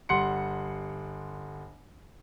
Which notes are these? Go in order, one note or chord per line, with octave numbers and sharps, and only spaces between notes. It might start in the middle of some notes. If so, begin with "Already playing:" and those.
G1 G3 F#5 C6 C#7